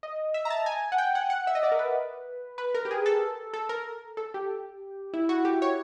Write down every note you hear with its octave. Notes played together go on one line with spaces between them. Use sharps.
D#5
E5
A#5
A5
G#5
F#5
G5
F#5
F#5
E5
D#5
D5
A#4
B4
B4
A#4
G4
G#4
A4
A4
A#4
A4
G4
E4
F#4
G4
C#5